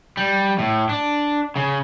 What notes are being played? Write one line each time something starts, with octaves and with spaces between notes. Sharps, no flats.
G3
A2
D4
C#3